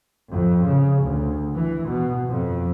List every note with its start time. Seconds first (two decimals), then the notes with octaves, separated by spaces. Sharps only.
0.34 F2
0.67 C#3
1.02 D2
1.54 E3
1.88 B2
2.28 F2